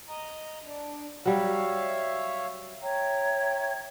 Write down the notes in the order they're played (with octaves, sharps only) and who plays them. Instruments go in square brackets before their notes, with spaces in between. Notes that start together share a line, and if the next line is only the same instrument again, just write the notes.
[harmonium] D#5 A#5
D4
[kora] F#3 G3 [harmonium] C#5 E5 F5
[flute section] C#5 E5 G5 A#5